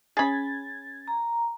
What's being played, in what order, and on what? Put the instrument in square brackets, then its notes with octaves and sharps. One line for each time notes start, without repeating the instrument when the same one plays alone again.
[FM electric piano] C#4 G#6 A6 [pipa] G#4 B5
[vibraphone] A#5